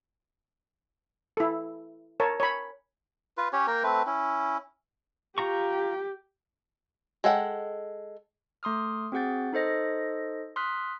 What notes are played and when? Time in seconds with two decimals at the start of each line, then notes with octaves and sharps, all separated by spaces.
1.37 E4 A4
2.20 A#4 C#5 A5
2.40 C#5 B5
3.37 F4 B4
3.53 C#4 G4 C#5
3.67 A#3 A#4 G5
3.83 A3 C4 B4
4.06 C#4 E4
5.38 F4 G4 A#5 C#6
7.24 G#3 A4 F#5 G5
8.63 A3 C6 D#6 F6
9.12 C4 F#4 G#4 F#5 G6 A6
9.53 D#4 A4 C5 D#5 A#6
10.56 C6 D#6 F6 F#6 B6